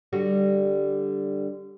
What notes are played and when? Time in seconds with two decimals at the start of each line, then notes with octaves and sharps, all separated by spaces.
0.13 D3 G3 F#4